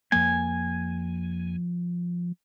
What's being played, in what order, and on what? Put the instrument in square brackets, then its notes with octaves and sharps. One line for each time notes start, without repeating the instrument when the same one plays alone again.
[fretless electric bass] F2 A#3 [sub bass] F3 [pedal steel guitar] G#5